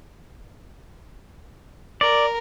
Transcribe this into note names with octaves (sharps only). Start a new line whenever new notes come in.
A#4 D5